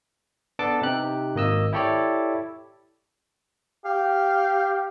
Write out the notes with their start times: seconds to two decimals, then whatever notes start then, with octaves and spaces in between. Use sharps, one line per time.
0.59 B3 D4 A4 A5 D6
0.82 C3 D#4 G4 F#6
1.35 G#1 A#3 D#5 E6
1.73 E4 G4 A4 C#5 D5
3.86 G4 F5